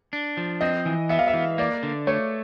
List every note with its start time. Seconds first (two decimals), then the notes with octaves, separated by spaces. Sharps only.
0.13 D4
0.37 F3
0.61 C4 D#5
0.86 E3
1.09 B3 E5
1.19 F5
1.28 E5
1.34 E3
1.58 A#3 D5
1.83 D3
2.07 A3 C#5